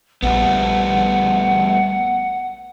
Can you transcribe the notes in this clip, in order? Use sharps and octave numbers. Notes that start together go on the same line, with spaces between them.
A#1 G3 A3 B3 F#5